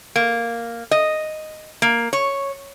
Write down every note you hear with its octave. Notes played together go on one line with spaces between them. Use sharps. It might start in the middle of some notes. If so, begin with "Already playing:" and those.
A#3
D#5
A#3
C#5